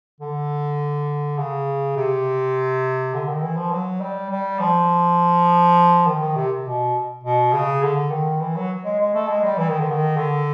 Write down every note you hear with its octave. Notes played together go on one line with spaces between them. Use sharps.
D3
C#3
C3
D3
D#3
E3
F3
F#3
G3
G3
F3
D#3
D#3
C3
B2
B2
C#3
D3
D#3
E3
F#3
G#3
G#3
A3
G#3
G3
E3
D#3
D3
D#3
D3